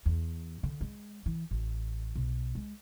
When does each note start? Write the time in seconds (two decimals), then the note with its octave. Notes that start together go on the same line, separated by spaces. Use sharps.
0.06 E2
0.63 D3
0.81 G#3
1.26 E3
1.51 A1
2.15 B1
2.55 G#3